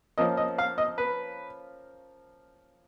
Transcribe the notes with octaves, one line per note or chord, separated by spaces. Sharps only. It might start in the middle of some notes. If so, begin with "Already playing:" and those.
F3 A#3 C#4 D#5
D#5
F5
D#5
B4